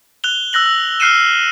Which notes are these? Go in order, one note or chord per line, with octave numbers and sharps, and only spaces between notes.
F#6 F7 G7
E6 F#6 A#6 F#7
E6
F6 F#6 C7 C#7 D#7 E7